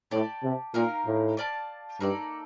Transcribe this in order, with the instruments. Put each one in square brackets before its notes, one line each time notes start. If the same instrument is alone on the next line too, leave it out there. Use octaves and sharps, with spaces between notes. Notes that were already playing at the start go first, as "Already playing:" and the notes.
[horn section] A2 [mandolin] G4 D5 A5
[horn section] C3
[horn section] A#2 [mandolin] D#4 G4 A#4 F5
[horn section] A2
[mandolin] G4 D5 F5 A5
[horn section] G2 [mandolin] A#3 D#4 A4 D5